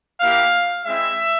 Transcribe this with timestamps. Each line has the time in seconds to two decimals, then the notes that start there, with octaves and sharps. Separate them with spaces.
0.21 A#3 E4 G4 F5
0.85 G#3 C4 E4 E5